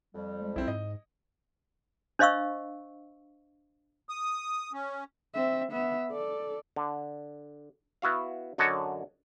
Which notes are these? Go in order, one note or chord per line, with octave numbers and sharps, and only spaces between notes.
F2 G3
G#3
B1 C4 E4
G#2 D#5
D4 C5 D#5 F5 C#6 E6
D#6
C#4
C4 E5
B3 E5
A4 D5
D3
B3 E4 F#4 F5
F#2 D3 C#5 D#5 F#5 A5